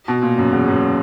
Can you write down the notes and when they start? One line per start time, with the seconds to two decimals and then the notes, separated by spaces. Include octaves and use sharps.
0.08 B2
0.22 A#2
0.38 F#2
0.53 E2
0.68 F#2